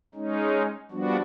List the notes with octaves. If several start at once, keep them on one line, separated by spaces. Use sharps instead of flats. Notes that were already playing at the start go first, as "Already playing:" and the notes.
G#3 C#4 D#4
F3 G3 B3 D4 F#4